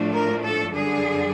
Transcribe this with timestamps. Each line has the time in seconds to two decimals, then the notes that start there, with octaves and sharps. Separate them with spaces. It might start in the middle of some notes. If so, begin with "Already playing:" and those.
Already playing: A2 F3 A3 D4
0.13 A#4
0.44 A4
0.74 F#2 D3 G3 G#4